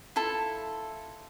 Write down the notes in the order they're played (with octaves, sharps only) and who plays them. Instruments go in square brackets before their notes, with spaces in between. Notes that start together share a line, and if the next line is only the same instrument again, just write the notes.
[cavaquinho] E4 F4 A4